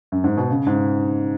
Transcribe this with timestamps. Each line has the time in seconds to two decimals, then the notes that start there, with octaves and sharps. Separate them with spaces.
0.12 F#2
0.24 G#2
0.37 B2
0.51 C#3
0.67 G#2